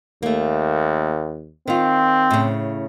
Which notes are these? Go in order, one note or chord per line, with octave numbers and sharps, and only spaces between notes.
D#2 A3 A#3
D#3 C4 F4
A2 C#3